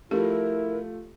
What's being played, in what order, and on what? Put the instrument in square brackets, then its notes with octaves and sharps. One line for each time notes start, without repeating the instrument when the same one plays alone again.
[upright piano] F3 A3 [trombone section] E4 [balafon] G4 [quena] A#4